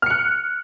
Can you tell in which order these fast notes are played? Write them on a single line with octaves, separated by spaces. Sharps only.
F6 C#7 F#6